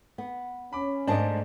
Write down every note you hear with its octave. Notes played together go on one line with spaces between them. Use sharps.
B3
C#4 B5 D6
G#2 A3 D4 A#4 C5 D#5 G#5 A5